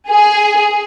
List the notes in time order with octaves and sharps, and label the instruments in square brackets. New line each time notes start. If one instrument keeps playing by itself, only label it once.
[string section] G#4